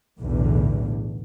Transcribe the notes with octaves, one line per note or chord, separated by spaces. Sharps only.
B1 E2 A2 D3